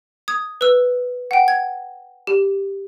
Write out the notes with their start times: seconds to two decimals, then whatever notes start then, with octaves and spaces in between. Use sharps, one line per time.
0.28 D#6 G#6
0.61 B4 E6
1.31 F#5 G5
1.48 G#6
2.27 G4